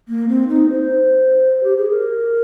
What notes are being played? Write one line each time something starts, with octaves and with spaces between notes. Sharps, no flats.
A#3
C4
D#4
C5
G4
G#4
A#4